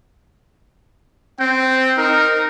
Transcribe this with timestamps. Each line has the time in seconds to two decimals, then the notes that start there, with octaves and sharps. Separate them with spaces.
1.40 C4 G5
1.98 D#4 A#4